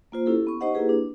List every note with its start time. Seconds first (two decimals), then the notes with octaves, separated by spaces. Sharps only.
0.12 A#3 F4 C5
0.26 C#4 E4 G4 A4
0.47 B3 C#6
0.61 D#4 G4 C5 D#5 F#5
0.74 A#3 E4 G4 G#4 B4
0.89 D4